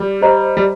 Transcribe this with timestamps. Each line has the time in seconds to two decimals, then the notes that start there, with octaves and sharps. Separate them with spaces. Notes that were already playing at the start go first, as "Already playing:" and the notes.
Already playing: G3
0.22 G4 C5 D#5 A#5
0.57 G3